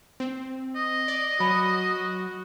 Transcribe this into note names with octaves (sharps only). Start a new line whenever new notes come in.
C4
D#5
D5
F#3 F#4 A5 B5